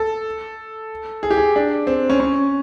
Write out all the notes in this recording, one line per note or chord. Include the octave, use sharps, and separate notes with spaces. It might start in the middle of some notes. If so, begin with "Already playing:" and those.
Already playing: A4
G#4
G4
G#4
D4
C4
C#4
C#4